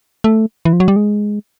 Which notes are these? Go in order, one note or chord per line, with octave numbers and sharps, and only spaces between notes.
A3
E3
F3
F#3
G3
G#3